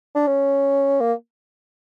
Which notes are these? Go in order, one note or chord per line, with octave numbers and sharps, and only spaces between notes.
D4
C#4
A#3